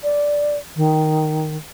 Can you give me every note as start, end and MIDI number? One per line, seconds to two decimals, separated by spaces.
0.03 0.57 74
0.76 1.56 51